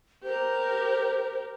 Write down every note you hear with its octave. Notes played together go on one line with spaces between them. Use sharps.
G4 A#4 C5